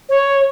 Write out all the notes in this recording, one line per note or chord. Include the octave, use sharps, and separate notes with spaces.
C#5